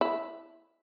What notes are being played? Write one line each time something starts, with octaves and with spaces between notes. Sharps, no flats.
E4